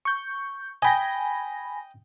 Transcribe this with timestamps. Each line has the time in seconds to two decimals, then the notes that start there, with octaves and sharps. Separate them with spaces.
0.05 C#6 G6
0.82 D#5 G5 G#5 B5 A#6